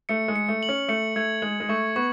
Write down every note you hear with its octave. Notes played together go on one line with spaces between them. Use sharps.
A3 C#7
G#3
C#7
A3
F#7
C#4
A3 C#7
A3 G#6
G#3 F#7
G#3
A3 C#6
B3 C#6